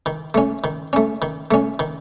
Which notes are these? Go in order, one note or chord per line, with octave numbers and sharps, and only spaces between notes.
D#3
A3 C#4
D#3
A3 C#4
D#3
A3 C#4
D#3